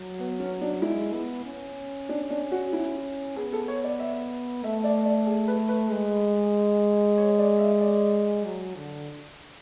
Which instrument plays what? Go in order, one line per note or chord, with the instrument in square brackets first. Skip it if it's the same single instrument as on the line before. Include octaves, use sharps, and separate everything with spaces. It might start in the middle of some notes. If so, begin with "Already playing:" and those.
Already playing: [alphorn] F#3
[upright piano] B3
C#4
D4
[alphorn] G#3 [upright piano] E4
[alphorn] B3
C#4
[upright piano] D4
D4
F#4
E4
[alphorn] B3 [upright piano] G#4
[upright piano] A4
C#5
D5
E5
[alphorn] A3 [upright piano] E5
[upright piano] D5
D5
G#4
B4
B4
[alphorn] G#3
[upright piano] C#5
D5
E5
D5
[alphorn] F#3
D3